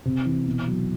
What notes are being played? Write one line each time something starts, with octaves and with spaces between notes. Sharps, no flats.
C3
E3
B2
F#3